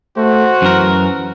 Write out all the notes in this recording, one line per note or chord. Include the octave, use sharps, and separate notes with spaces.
A3 F#4 C5
F#2 E3 A#4